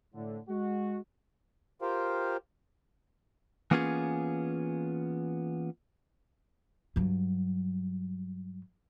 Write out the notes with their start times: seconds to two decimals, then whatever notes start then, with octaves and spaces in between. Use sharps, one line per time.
0.14 A2 D3
0.49 G#3 F#4
1.82 F4 G4 A#4 C5 F5 G5
3.71 E3 A#3 B3 C#4 F4 G#4
6.96 G2 F#3